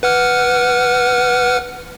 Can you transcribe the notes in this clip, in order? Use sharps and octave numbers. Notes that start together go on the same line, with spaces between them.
B4 F#5 F6